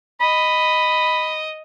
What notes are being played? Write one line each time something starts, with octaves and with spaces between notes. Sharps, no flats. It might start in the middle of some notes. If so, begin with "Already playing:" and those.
D#5 B5